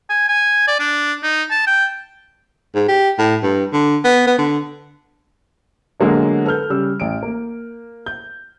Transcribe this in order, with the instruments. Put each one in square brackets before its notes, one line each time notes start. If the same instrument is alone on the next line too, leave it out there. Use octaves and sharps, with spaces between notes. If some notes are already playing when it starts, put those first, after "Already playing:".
[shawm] G#5
G#5
D5
D4
D#4
A5
G5
[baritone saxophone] G#2
G4
A2
G2
D3
B3
B3
D3
[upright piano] D3 F#3 G#3 A#3 B3 D4
A4 B4 F6 G6
C#3 G3 E6
A1 D7
A#3
G6